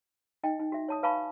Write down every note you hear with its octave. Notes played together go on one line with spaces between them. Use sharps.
D#4 D#5 G5
D#4
F#4 E5
C#5 A5 D#6
B4 F5 G#5 A5 B5 C#6